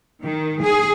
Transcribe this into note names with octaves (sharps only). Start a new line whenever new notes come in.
D#3
G#4